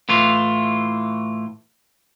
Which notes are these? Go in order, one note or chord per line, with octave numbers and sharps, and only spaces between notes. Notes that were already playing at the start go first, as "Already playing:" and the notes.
A2 E3 F4